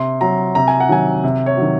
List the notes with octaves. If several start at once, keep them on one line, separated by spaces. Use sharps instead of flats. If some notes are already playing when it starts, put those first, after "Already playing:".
Already playing: C3 C6
F#3 A#5
C3 A#5
G#5
F#5
D#3 F#3 G#5
C3
C#5
D#3 F#3